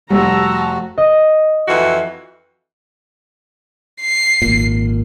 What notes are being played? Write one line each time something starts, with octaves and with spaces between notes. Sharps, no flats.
F1 G3 F#4 A5 A#5 E6
D#5
F2 E3 F#4
C7
G#1 A#2